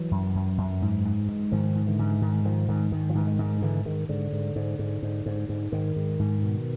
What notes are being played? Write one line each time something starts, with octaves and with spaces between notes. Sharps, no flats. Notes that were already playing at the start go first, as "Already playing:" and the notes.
Already playing: E3 F#3
F#2
F#2
F#2
G#2
G#2
G#2
G#2 D#3 F3
G#2
D3 E3
G#2
G#2 D#3
G#2 D#3 F3
G#2 D#3
G#2 D#3
F3
G#2 E3
D#3
G#2
G#2 D3 E3
G#2 D#3
G#2 D3
G#2
G#2
G#2
G#2
G#2
G#2
G#2 D#3
G#2
G#2
B2